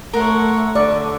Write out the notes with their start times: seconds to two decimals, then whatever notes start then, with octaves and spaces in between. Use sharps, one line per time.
0.13 A3 A#4 C#5 F#5 C6
0.75 D3 D5 C#6